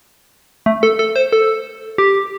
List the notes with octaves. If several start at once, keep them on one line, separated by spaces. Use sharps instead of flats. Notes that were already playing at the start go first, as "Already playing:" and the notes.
A3
A4
A4
C5
A4
G4